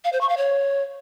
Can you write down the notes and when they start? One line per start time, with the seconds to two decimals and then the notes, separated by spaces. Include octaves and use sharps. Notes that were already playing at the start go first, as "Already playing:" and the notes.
0.04 F5
0.13 C5
0.21 C#6
0.29 F5
0.37 C#5